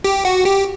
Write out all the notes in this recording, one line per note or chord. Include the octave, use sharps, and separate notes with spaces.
G4
F#4
G4